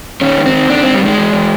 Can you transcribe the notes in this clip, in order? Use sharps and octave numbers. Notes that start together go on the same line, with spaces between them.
D#3 C#4
G#2
C4
D#3
D#3 D4
G#2 C4
G3
D#3 G#3
E3
E3